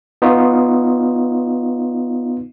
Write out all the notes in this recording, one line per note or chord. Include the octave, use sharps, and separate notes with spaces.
B3 D#4 F4